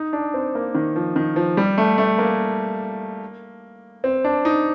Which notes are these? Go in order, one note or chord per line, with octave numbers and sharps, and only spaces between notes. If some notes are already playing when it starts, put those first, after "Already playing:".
Already playing: D#4
D4
C4
A#3
D#3
F3
D#3
F3
G3
A3
A3
A#3
C4
D4
D#4